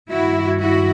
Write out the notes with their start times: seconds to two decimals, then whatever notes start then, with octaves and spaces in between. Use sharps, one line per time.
0.10 G2 D#3 E4 F#4
0.60 E4 F#4